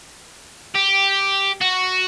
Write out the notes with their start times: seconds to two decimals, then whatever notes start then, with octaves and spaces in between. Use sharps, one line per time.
0.75 G4
1.61 F#4